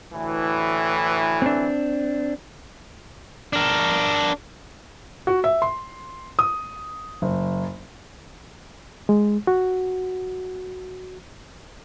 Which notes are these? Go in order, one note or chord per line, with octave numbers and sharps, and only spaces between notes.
D2 A2 E3
C4 D4
D4 A#4
F#4
E5
C6
D#6
F#1
G#3
F#4